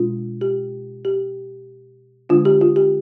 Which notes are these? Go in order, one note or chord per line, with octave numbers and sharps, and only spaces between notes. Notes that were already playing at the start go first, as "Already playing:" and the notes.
Already playing: B2 G#3 D4 F4
G4
G4
D3 G#3 D4 F4
G4
F4
G4